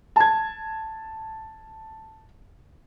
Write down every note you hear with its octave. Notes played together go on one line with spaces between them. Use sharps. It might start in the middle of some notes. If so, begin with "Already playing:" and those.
A5 G#6